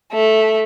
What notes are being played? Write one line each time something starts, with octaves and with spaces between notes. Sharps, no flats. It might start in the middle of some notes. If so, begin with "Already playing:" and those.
A3